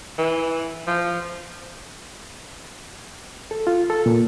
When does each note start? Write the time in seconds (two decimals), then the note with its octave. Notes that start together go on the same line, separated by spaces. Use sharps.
0.18 E3
0.87 F3
3.51 A4
3.67 F4
3.90 A4
4.06 A#2